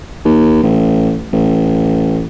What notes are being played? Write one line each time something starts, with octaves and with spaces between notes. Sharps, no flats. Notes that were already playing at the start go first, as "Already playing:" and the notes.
D#2
A1
A1